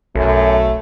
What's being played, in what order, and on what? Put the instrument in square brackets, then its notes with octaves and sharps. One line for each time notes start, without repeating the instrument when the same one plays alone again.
[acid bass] B1 [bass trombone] F#2 [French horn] A3